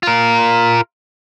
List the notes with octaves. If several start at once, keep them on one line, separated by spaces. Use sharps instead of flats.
F4 A#4